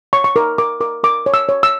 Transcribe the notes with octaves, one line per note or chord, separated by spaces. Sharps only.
C#5 C#6
C#6
A#4 D6
A#4 D6
A#4 D6
A#4 D6
C#5
E6
C#5
E6